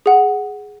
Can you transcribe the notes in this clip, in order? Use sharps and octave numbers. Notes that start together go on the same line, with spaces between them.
G#4 F#5